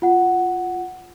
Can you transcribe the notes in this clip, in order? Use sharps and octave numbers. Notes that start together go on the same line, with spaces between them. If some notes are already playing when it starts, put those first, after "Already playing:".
F4 F#5